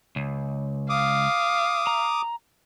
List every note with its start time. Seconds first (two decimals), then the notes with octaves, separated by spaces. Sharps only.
0.16 C#2
0.90 F5 D6 D#6
1.87 A#5